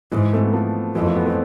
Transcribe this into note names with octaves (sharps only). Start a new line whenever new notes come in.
G#2 E3 G#3
A3 C4
G#3 B3
F3 A3
F2 E3 G#3
F3 A3
G#3 B3
A3 C4